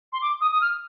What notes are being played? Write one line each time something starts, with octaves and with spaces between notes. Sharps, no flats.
C6
D6
D#6
D#6
F6